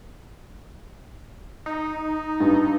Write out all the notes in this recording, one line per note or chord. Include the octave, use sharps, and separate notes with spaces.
D#4
G2